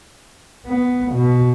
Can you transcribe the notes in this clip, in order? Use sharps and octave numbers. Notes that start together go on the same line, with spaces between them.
B3
B2